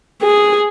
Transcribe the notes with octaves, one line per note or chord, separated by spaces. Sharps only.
G#4